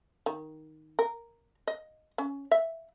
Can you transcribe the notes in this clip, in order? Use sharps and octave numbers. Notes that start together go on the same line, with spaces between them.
D#3
A#4
D#5
C#4
E5